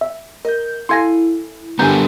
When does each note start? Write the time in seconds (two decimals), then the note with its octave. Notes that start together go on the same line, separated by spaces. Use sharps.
0.01 E5
0.45 A#4 D#5 G6
0.89 E4 A4 F5 G#5 C6 G#6 A#6
1.79 D3 G3 B3 D4 A#4 G#5 A#5 G6